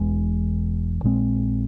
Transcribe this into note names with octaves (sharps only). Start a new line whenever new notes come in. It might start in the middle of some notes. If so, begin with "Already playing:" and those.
Already playing: E1 E2 E3 G#3
A#1 A#2 G#3 C4